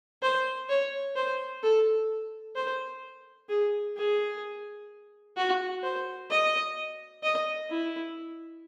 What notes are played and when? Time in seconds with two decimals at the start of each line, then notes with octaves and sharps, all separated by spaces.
0.22 C5
0.69 C#5
1.16 C5
1.63 A4
2.56 C5
3.49 G#4
3.97 G#4
5.37 F#4
5.83 C5
6.30 D#5
7.23 D#5
7.70 E4